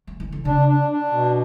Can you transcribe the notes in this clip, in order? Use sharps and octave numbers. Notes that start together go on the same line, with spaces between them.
F#3
E3
D3
C#3 D4
D4
D4
B2